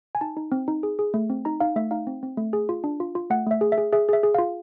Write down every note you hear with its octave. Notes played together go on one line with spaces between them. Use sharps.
G#5
D#4 A5
D#4
C4
D#4
G#4
G#4
A3
C4
D#4 A#5
D#4 F5
A3 E5
D#4 F5
C4
C4
A3
G#4
F4
D4
F4
F4
A3 F#5
A3 E5
G#4
E5
G#4
G#4 E5
G#4 E5
G#4
F4 F5